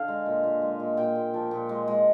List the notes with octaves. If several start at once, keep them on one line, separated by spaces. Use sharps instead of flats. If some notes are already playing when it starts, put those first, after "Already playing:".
Already playing: D3 F5
G#3
A#2
A#2
G#3
A#2
A#2 G5
A#2
F3
A#2
G#3
G#3